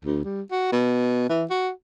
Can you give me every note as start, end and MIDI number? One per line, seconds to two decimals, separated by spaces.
0.05 0.22 38
0.24 0.42 55
0.51 0.69 66
0.72 1.24 47
1.29 1.45 52
1.50 1.70 66